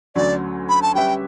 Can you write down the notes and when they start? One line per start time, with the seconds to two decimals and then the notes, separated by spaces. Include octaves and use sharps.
0.15 D2 D3 F#3 C#4 D5
0.69 B5
0.82 A5
0.95 G3 C#4 G4 B4 E5 G5